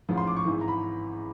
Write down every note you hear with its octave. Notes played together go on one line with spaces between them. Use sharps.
A1 G#2 F3
C6
D6
C#6
G#1 G#2 E3
A#5
B5